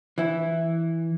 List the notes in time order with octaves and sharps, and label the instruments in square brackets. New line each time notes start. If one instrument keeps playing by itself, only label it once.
[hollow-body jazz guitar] E3 E4